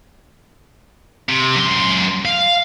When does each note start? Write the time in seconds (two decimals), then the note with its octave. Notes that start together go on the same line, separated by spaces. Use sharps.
1.29 C3
1.55 F#2 C6
2.25 F5